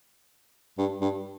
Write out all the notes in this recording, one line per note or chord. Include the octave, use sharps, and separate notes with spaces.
G2
G2